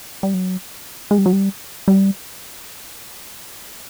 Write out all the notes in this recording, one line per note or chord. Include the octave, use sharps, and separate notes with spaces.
G3
F#3
G#3
G3
F#3
G3
G3